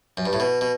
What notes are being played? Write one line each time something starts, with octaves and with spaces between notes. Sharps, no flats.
F#2
G2
A2
B2
B2